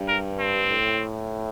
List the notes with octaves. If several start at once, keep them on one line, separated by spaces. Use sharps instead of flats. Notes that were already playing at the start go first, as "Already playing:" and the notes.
Already playing: G2
A#4
C4
A2